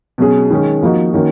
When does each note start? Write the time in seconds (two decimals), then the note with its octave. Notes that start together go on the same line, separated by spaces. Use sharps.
0.18 B2 F#3 C#4 G#4
0.50 D#3 G#3 C#4
0.82 F3 A#3 D#4 F#4
1.13 D#3 A#3 C#4 F#4